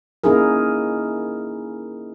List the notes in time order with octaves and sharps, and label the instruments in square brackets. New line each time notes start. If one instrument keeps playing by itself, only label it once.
[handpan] A#3 C#4 D#4 E4 G#4 A#4